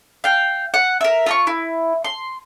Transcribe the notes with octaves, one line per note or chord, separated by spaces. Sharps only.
F5 G5
F#5
A#4 E5
F4 A#5 C#6
E4
C6